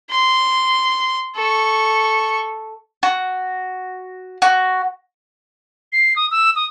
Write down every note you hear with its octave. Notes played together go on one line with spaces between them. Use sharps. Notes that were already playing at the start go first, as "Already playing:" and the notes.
C6
A4 C#6
F#4
F#4
C7
D#6
E6
D#6